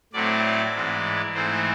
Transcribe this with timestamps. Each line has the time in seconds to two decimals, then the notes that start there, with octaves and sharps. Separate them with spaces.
0.13 A2 F#3 A3 C4 D5
0.74 G#2 E3 G#3
1.34 G#2 E3 A3 C4 C5